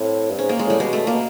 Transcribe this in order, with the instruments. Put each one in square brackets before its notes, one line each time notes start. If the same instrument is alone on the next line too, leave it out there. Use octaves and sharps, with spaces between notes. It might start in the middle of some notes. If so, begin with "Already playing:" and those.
Already playing: [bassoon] A2 [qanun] C4
[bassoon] G2
[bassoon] G#2 [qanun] C#4
[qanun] A#3
G#3
[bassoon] A2 [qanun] G3
[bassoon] B2 [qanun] G#3
[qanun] A3
[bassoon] A#2 [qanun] A#3
[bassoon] B2